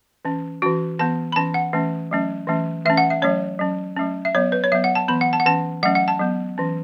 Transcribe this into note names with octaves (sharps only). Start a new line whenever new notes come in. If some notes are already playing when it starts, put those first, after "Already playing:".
E3 C#4
E3 C#4 F#4
E3 B3 A5
B5
E3 C#4 A5
F#5
E3 A3 C#4
F#3 A3 C#4
E3 A3 C#4
E3 A3 C#4 E5
F#5
E5
F#3 A3 C#4 C#5
F#3 C#4
F#3 A3 C#4
E5
F#3 B3 C#5
B4
C#5
F#3 B3 E5
F#5
A5
E3 B3 B5
F#5
A5
F#5
E3 C#4 A5
F#3 A3 C#4 F#5
F#5
A5
F#3 B3
E3 C#4